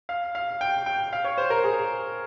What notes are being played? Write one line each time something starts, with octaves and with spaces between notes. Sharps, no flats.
F5
F5
G5
G5
F5
C#5
C5
A#4
G#4